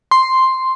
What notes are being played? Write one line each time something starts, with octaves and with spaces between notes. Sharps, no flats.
C6